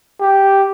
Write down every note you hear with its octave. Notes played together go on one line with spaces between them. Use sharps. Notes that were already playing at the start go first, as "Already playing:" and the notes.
G4